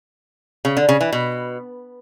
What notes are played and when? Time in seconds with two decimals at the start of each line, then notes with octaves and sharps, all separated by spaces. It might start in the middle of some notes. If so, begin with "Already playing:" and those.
0.65 C#3
0.77 D3
0.89 C#3
1.01 E3
1.13 B2